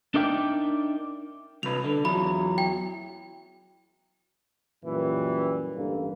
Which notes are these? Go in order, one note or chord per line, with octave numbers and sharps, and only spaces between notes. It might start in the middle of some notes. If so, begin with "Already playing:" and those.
D4 D#4 A#4 D5 E5 G5
C2 B4 F7
D3
E2 E3 F#3 B5
G5
F#2 A#2 E3 G3
A1 G2 D3 A#3